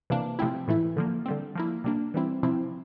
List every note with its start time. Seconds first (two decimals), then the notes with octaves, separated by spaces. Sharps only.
0.10 C3 E3 A#3 D4
0.39 C3 F3 A3 C4 E4
0.68 A2 E3 A3 E4
0.97 D3 F3 A#3
1.26 D3 G3 C4
1.55 F3 A#3 E4
1.84 C3 G3 A#3 D4
2.14 E3 G3 C4 E4
2.43 C3 F3 C4 E4